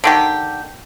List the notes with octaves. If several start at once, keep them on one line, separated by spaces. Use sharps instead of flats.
D3 D#3 G4